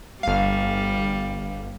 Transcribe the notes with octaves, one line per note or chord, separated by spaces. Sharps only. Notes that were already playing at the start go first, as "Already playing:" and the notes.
G1 G3 F5